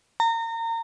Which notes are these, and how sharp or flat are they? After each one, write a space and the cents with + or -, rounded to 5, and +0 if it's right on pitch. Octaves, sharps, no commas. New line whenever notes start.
A#5 -30